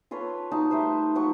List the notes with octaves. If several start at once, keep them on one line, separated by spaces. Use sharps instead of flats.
F4 A4 B4 C#5
D#4 F#4 F5 A5
G3 A3 B4 C5
F3 F#3 C#6